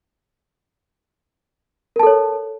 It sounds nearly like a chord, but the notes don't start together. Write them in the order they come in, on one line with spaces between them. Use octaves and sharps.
A#4 A5 A4 C#5